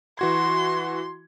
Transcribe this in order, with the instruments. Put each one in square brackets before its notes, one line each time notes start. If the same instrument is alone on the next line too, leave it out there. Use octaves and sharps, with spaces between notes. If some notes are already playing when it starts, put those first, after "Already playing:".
[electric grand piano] E3 F#4 G#6 [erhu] C6